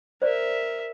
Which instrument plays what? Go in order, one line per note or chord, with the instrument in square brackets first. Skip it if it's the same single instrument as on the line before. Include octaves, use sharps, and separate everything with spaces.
[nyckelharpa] A#4 E5 [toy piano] C5 D5